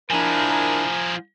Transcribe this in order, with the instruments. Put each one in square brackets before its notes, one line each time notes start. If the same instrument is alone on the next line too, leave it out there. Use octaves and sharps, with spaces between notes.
[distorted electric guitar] F3 G#4 [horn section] D4 E4 A#4 [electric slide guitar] G#5 A#5